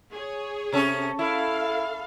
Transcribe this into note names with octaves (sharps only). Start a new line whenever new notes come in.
G#4 C#5
C3 C#4 A4
E4 A4 F5